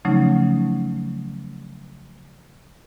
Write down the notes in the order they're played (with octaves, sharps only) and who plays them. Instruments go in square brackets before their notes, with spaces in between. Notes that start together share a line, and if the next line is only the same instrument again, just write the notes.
[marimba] C#3 F3 F#3 A3 C#4 D#4